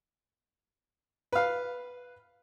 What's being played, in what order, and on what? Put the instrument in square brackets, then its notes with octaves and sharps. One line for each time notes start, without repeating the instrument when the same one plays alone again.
[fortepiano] B4 F5